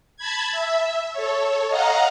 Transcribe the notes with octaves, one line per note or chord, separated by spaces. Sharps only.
A5 B5 G#6
E5
A4 C#5
D#5 F5 F#5 A#5